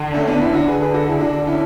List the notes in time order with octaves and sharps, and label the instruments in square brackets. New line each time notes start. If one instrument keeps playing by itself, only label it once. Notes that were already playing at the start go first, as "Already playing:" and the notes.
Already playing: [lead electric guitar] D3
[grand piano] A3 C#4
B3 D4
C#4 E4
D4 F#4
G#4 B4
G#4 B4
F#4 A4
E4 G#4
D4 F#4
C#4 E4